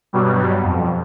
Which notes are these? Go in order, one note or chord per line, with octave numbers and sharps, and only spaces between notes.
G2 B2 F#3 G3
F2